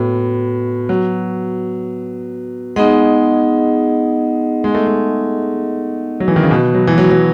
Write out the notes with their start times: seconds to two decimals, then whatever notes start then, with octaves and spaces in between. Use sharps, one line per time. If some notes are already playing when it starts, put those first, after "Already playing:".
Already playing: A2 B3 F#4 B4
0.89 F#3
2.76 G#3 B3 D#4 G#4 D#5 F#5
4.64 G#3
4.75 A3
4.87 G#3
6.20 F#3
6.28 E3
6.36 D#3
6.43 C#3
6.50 B2 B3 F#4 B4
6.74 F#3
6.87 E3
6.98 F#3
7.11 F#3